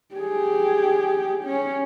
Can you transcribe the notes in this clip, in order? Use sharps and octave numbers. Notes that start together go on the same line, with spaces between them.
G4 G#4
C#4